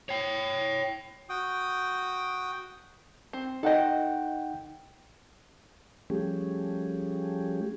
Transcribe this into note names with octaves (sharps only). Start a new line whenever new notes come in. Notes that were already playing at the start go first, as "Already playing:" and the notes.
C#5 G5
F#4 G5 D#6
C4
D#4 A4 D#5 F#5 G5
F3 G3 A3 C#4 G4 G#4